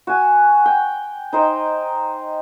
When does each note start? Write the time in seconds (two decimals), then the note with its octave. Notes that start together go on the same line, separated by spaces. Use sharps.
0.07 F#4 G#5
0.66 G5
1.33 D#4 C5 G5